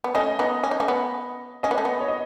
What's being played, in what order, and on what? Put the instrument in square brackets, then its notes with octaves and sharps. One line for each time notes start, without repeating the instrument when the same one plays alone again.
[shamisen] B3
[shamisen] A3 C#4 [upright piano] D#5
[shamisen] B3 D#4
C#4
D#4
A3 C#4
B3
[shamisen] C#4 [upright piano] D#5
[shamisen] B3
A3
B3
[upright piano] C#5
D#5